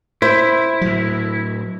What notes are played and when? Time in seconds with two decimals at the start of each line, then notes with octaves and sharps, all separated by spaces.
0.22 E4 C5
0.81 A2 F#3